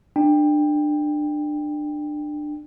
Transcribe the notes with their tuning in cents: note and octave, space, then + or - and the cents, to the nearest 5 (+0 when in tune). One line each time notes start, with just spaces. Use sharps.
D4 +25 G5 +20